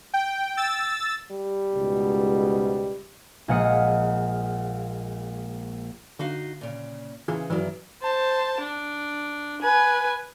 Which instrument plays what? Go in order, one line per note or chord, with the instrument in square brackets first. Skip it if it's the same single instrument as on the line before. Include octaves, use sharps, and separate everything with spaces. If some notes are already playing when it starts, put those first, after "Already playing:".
[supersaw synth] G5
E6 A6
[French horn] G3
[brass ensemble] C#2 G#2 B2
[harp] A#1 G#3 F5 F#5 D#6 C#7
[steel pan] D3 [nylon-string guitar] D#4 F#4 F5
[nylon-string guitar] A#2 C#3
[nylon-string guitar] C#3 [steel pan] E3 F4 G#4
[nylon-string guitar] G2 D#3 [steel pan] E3 F#3
[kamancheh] C5 A5
D4
B4 G#5